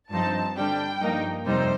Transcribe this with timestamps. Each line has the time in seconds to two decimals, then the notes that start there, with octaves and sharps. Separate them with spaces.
0.11 G2 F3 C4 D#4 A5
0.56 D3 G3 D4 G5
1.01 G2 F3 A#3 D#4
1.46 F2 C3 G3 C4 D#4 C5